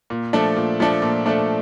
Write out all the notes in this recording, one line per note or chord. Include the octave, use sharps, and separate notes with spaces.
A#2
F3 A3 D4 A4
A#2
F3 A3 D4 A4
A#2
F3 A3 D4 A4